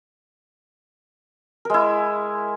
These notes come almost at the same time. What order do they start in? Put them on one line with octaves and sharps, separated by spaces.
A#4 G#3 E4